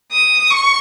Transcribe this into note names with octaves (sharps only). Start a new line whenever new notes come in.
D#6
C#6